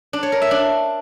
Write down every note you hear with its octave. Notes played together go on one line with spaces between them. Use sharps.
D4
C#5
A#4
E5
D4